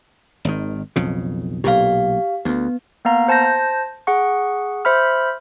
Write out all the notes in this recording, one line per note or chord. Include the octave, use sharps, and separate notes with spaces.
G#1 D#3
B1 F2 C#3
B1 A#2 G4 F5
D2 B3
A#3 B3 F5 A#5
C5 A5 G6 A#6
G#4 F#5 C#6
C5 E5 B5 F6